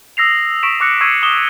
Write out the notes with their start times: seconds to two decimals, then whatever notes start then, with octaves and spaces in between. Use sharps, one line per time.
0.17 D#6 E6 A#6 C7 F7
0.63 C#6 B6 D7 E7
0.80 C#6 D6 E6 F#6 A#6 C#7
1.01 C#6 D#6 E6 G#6 C7 D#7
1.23 D6 D#6 C7 E7 G7